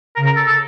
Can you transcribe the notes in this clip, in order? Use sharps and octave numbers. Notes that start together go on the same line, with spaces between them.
C#3 A#4
A#4
A4
A4